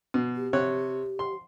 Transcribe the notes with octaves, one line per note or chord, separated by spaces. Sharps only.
B2
G4
C3 C#5 F#6
C6